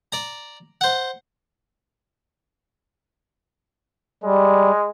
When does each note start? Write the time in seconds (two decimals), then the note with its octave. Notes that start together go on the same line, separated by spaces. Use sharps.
0.12 D5 A#5
0.81 C5 F#5
4.24 G3 G#3